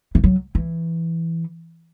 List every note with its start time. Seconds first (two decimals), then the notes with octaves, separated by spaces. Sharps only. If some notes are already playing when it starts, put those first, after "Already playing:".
0.15 E3
0.24 F#3
0.55 E3